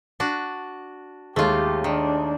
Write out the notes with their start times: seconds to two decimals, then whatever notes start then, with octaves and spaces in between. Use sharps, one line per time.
0.20 D4 F#4
1.36 D#2 G#3 A3 F4 G4
1.84 D#3 D4